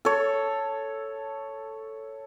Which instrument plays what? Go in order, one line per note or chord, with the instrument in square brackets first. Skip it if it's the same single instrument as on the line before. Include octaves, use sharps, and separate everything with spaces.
[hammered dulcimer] A4 C#5